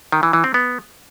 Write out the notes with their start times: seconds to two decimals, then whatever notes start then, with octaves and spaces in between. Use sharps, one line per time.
0.12 D#3
0.23 E3
0.33 E3
0.44 C4
0.54 B3